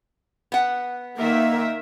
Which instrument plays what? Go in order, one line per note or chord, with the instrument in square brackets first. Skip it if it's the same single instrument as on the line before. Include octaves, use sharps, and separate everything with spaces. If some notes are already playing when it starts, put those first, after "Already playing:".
[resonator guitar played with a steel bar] B3 F#5
[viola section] D#3 A#4 E5 [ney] A#3